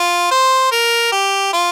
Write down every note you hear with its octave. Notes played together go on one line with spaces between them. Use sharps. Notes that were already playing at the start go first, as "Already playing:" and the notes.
Already playing: F4
C5
A#4
G4
F4